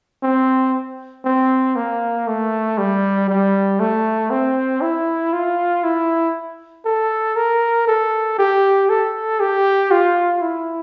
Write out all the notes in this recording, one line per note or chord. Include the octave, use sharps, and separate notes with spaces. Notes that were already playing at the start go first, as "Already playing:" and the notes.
C4
C4
A#3
A3
G3
G3
A3
C4
E4
F4
E4
A4
A#4
A4
G4
A4
G4
F4
E4